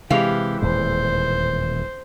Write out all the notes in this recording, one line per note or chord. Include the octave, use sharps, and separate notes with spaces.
C3 E3 G#3 G4 F5
D#1 E2 A2 C5